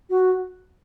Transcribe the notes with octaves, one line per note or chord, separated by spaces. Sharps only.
F#4